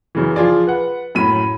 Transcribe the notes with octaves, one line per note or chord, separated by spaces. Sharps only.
F#2 C#3 E3
F3 F4 G#4 D5
B4 F#5
F#2 A2 B5 D#7